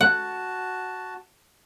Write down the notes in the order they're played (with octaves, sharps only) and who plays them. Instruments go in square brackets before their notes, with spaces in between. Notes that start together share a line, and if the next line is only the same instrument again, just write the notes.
[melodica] F#4 A5 [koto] F#5